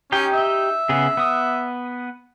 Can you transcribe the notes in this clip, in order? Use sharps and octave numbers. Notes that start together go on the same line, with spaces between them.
C#4 D#4 G4 G5
E5
C#3 B3 G#4
B3 D#6